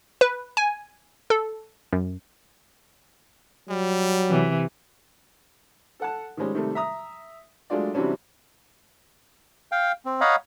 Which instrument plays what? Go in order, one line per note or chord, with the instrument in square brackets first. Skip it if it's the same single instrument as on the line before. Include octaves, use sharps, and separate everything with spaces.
[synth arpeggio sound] B4
G#5
A4
F#2
[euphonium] F#3 [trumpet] G3
[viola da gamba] C3 E3
[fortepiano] A4 F#5 A5
D#3 F3 G3 G#3 C#4
C3 D#3 G3 A3
E5 A#5 D#6
F#3 G#3 A3 D4 F4 D5
C3 E3 F#3 G3 C#4 D4
[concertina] F5 G5
C4
C#5 D#5 F5 F#5 A#5 B5